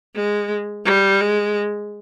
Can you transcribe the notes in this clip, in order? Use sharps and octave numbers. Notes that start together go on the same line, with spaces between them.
G#3
G3
G#3